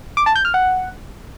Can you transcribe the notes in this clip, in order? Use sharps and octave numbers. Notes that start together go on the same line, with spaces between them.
D6
A5
G6
F6
F#5